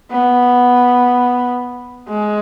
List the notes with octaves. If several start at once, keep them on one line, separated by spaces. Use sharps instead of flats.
B3
G#3